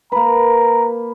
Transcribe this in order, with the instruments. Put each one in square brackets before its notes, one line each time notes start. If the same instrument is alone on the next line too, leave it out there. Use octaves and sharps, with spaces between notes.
[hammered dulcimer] A#3 B4 [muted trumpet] A#5